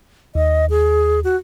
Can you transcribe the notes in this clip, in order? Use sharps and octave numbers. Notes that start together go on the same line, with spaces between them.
D#2 D#5
G#4
F#4